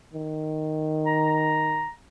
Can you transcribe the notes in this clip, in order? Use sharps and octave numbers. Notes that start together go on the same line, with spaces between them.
D#3
A#5